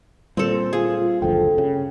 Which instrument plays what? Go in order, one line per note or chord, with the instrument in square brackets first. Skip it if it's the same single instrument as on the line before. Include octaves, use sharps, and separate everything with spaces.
[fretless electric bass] A#2 [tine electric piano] G3 [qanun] C4 A4
[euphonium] F4 [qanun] G#4
[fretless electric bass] F#1 D2 F3 [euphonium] A4 [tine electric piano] G5
[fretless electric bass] C#3